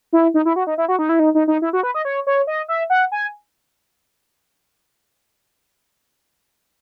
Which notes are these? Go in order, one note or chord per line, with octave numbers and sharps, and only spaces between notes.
E4
D#4
E4
F#4
D#4
E4
F#4
D#4
E4
D#4
D#4
D#4
E4
F#4
B4
D#5
C#5
C#5
D#5
E5
F#5
G#5